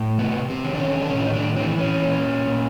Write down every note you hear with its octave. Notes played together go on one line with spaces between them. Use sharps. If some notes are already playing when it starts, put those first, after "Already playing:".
Already playing: A2
C3 B3
C4
D#3
D4
C#4
D4
A2 C#4
E4
D#4
D4
E3 C4
C#4
A#2
A#2